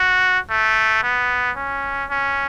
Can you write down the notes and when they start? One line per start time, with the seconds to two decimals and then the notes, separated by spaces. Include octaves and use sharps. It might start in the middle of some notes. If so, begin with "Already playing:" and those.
Already playing: F#4
0.50 A3
1.03 B3
1.57 C#4
2.10 C#4